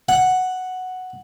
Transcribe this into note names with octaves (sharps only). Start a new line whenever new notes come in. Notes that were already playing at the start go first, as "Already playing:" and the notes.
F#5